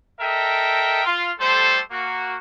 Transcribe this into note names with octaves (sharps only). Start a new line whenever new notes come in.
A4 A#4 D#5 E5 G5
F4
G3 A3 A4 C5
A#3 F#4